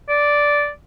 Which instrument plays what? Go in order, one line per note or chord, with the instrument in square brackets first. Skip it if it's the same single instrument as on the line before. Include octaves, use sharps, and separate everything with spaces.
[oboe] D5